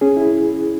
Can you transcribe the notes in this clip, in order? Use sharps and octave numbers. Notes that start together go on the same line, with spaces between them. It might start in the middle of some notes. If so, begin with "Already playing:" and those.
C#4 G#4
E4